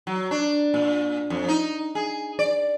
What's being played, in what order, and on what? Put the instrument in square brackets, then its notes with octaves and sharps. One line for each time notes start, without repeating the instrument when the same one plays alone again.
[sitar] F#3
D4
A#2
F2
D#4
G#4
D5